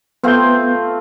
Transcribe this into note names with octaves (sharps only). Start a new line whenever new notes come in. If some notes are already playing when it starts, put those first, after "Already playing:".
A3 B3 C4 F4 G6